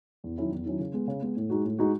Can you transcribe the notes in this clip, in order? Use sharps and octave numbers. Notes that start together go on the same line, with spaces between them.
E2
D#3 F#3 C#4 E4
E2
D#3 F#3 C#4 E4
C#3
G#3 B3
C#3
G#3 B3
A2
G#3 D#4 F#4
A2
G#3 D#4 F#4